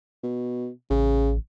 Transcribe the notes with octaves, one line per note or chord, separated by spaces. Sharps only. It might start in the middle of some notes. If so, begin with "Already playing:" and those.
B2
A1 C#3